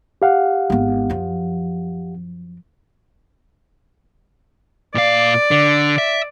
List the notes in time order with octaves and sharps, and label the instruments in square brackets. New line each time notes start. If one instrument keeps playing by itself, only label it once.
[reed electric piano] G4 F5 F#5
[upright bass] G#1 B3
F#2 F3
[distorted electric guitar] A#2 F5 [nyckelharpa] D5
[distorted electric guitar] D3
E5